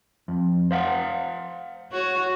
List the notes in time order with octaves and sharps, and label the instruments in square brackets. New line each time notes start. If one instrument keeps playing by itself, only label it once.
[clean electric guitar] F2
C5 F5 F#5
[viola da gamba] F#4 C#5